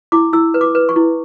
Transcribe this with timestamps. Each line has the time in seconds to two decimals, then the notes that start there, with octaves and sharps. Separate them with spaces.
0.12 E4 D6
0.33 E4 E6
0.54 B4
0.61 D6
0.75 B4
0.89 C#6
0.96 E4